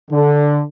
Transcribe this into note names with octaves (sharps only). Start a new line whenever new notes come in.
D3